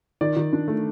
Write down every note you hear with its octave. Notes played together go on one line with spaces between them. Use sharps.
D#3 D5
D#3
D4
A3